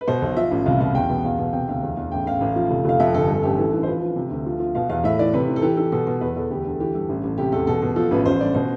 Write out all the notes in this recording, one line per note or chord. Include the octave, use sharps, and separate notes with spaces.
B4
B2 C5
B1
F3 E5
A1
C2 F5
B2 F5
E2 G5
B2
E2 F5
B2
C3 G5
D2 F5
E2
E2
A1 G5
A1 F5
A1
F3
F1
F1 F5
F2 E5
G1 A4
G2 A4
A1 G4
E3 A4
E3
C5
F3 B4
F3
C3
D2
F3
F3
B2 F5
E2 F5
A2 E5
E3 D5
C3 B4
E3
A4
E3 G4
E3 A4
B2 A4
B2
E2 B4
E2 A4
D2 G4
D3
E3 G4
G2 A4
A1
A1
C3 G4
E2 A4
B2 A4
B2
F3 A4
A1 B4
A1 C5
G2 D5
B2 C5